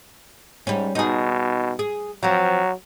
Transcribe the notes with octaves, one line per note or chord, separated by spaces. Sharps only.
G#2 G3 C#4
B2 D#4 G#4
G#4
F3 F#3 C4